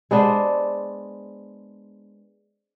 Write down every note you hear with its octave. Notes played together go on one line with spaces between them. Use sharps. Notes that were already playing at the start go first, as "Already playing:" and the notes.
G#3 B3 D4 C5